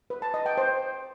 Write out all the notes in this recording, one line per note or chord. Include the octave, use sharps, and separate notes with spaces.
B4
A5
D#5
G5
C5